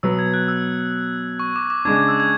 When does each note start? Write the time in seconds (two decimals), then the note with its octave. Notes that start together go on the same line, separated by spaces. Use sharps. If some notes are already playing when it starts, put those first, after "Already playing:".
0.03 B2 F#3 B3 E6
0.19 G#6
0.34 F#6
0.48 E6
1.40 C#6
1.56 D6
1.70 D6
1.85 C#3 G#3 D4 G#6
1.96 D6
2.08 E6
2.20 G#6